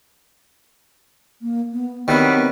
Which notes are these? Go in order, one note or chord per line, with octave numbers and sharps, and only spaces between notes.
A#3
B3
D#3 F#3 G3 B3 C4 E4 B4